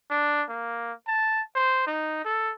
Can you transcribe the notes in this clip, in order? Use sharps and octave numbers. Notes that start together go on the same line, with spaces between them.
D4
A#3
A5
C5
D#4
A4